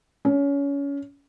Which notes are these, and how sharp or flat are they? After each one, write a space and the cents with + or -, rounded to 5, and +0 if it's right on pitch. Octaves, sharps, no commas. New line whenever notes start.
C#4 +25